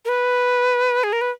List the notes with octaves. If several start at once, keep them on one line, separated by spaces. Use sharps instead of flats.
A#4
B4
G#4
A#4
B4